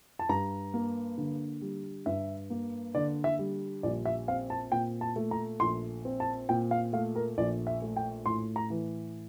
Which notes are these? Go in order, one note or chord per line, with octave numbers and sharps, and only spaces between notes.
A5
G2 A#5
A#3
D3
G3
G2 E5
A#3
D3 D5
E5
G3
A#1 D5
E5
C4 F5
A5
A#2 G5
A5
A3
A#5
A#1 C6
C4
A5
A#2 G5
F5
A3 F5
A#4
A#1 D5
E5
A3
G5
A2 C6
A#5
E3